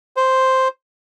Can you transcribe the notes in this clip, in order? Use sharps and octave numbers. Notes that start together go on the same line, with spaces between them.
C5